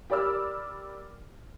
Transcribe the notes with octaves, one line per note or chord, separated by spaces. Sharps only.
G4 A#4 D5 B5 E6 F6